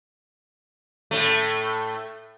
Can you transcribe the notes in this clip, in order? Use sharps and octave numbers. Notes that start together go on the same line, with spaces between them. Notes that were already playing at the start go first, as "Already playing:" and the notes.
A2 A3